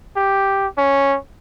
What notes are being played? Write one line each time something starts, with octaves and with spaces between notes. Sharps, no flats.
G4
C#4